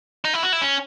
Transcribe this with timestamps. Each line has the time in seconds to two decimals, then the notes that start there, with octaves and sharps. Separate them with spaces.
0.25 D#4
0.34 E4
0.43 F#4
0.52 E4
0.61 C#4